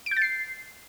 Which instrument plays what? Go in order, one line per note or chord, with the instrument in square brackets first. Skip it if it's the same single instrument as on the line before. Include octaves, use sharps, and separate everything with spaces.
[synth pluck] D7
G6
A6
C7